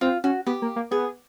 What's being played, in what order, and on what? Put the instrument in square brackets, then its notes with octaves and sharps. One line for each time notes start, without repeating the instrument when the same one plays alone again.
[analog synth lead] C4 [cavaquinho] F4
[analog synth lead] C#4 [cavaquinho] F#4
[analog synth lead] B3 [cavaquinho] G4
[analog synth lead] A#3
A#3
[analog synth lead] B3 [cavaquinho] G#4